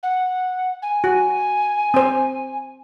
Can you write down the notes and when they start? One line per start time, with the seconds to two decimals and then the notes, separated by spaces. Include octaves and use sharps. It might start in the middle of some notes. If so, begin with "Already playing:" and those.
0.03 F#5
0.82 G#5
1.04 F#4
1.94 C4 C5